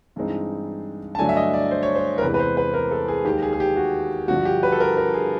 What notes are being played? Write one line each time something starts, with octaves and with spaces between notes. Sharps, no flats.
G2 E3 G#3 C4 D#4
A5
G2 D3 F#3 A3 D4 G#5
E5
D#5
D5
C5
C#5
C5
A#4
E2 C3 E3 G#3 B4
B4
C5
B4
A#4
A4
G#4
D#2 D#3 G#3 G4
G#4
G#4
G4
F#4
G2 D3 F3 F#4
G4
B4
A4
A#4
A#4
G#4